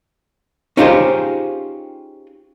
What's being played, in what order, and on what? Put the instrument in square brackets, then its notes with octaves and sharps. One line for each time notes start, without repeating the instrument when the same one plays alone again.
[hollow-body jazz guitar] C#4 D#4 F4 G4 G#4 C5